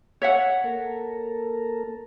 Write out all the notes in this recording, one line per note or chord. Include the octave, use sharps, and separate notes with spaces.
C#5 E5 F#5
A#3 A4 A#4